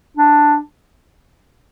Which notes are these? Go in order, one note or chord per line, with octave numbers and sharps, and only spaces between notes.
D4